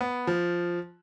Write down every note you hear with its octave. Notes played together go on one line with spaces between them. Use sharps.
B3
F3